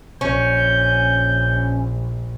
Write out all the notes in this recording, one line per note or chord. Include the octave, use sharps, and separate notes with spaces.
A#1 C#4 G6